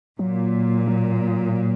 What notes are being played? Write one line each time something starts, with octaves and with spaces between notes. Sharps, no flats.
A#2 F#3
F#3